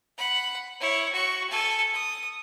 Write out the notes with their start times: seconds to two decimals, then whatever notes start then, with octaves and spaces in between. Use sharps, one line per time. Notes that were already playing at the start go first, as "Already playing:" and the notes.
0.17 F#5 B5
0.80 E4 C#5
1.12 F#4 C#6
1.50 A4 G#5
1.93 D#6